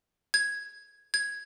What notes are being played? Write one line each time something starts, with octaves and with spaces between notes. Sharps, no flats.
G#6
G#6